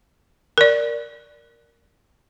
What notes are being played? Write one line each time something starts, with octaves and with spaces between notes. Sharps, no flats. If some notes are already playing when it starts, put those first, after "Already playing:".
A#4 D5